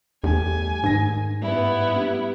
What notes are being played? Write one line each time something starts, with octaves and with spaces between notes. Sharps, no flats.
E2 G3 A3 G4 G#5
G#2 D#3 A#6
G2 B3 E4
G3